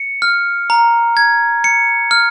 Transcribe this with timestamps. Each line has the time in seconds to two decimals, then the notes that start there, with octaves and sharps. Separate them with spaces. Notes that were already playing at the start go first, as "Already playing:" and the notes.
Already playing: C#7
0.22 F6
0.70 A#5
1.17 G#6
1.64 C#7
2.11 F6